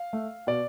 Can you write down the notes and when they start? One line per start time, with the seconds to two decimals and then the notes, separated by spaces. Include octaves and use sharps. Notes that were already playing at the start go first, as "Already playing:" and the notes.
Already playing: F5
0.13 A3
0.47 B2 D5